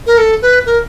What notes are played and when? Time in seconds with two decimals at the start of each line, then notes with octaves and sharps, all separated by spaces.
0.07 A#4
0.18 A4
0.42 B4
0.66 A#4